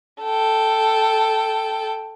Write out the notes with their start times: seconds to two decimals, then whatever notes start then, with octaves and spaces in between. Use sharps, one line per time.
0.24 A4 G5